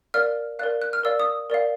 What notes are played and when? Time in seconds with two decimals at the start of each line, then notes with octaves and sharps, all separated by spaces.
0.14 A#4 D5 F5 F6
0.59 A#4 D5 F5 F#6
0.82 F#6
0.93 F6
1.04 A#4 D5 F5 E6
1.20 D#6
1.50 A#4 D5 F5